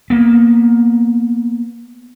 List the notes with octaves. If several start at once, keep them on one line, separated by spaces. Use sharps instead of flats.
A#3 B3